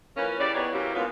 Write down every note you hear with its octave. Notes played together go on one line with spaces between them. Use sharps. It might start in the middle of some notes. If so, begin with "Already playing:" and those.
E3 F3 A#3 C#4
C#3 E3 G4 D5
E3 B3 C4 D#4 G4 C#5
C3 E3 F#3 A#3 C#4 G4
G#2 B2 A#3 B3 F4